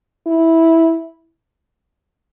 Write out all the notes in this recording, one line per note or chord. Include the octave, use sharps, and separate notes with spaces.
E4